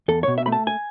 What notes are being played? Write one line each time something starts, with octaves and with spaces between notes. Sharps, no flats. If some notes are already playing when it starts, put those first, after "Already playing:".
E2 A4
B2 C#5
E5
A3 B5
A5
G#5